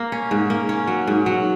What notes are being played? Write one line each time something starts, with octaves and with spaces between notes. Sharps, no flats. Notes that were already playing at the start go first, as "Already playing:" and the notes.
Already playing: A#3
C#4
G#2
A#3
C#4
F#3
G#2
F#3